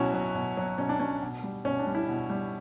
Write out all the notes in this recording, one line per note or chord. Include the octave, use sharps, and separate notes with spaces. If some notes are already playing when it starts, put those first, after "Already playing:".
Already playing: B2 F#3 C#4 E4 F#4
F#3
B2
F#3
B2 C#4
D4
F#3 C#4
B2
G3
B2 C#4
D4
G3
E4
B2
G3